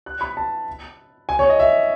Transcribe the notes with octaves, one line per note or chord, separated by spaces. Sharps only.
F#6
B5
A5
G#5
C#5
D#5
E5